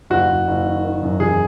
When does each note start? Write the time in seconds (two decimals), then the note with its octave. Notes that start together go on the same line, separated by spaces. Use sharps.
0.10 F#1 F#4
0.29 F#1
0.47 F#1
0.66 D#3
0.84 D#3
1.02 F#2
1.20 E1 G#4